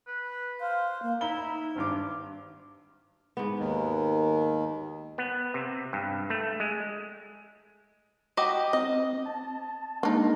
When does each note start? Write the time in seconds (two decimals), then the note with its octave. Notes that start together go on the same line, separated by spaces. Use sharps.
0.07 B4
0.60 C5 F5
1.03 A#3
1.21 D#4 E4 A#5 B5 G7
1.76 G#1 G2 F4 D6
3.37 G#2 B3
3.59 D#2 D#3
5.18 B3
5.54 C3
5.93 G2
6.30 A3
6.60 G#3
8.37 F#4 G4 D#5
8.73 C4 D#5
9.26 A5
10.03 G#3 A#3 D4 D#4